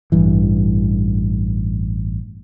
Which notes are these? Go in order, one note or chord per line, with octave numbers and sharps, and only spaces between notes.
A1 G2 E3